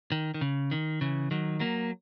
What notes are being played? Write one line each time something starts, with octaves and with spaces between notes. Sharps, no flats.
D#3
D#3
C#3
D#3
C#3 E3
D#3 F#3
F#3 A#3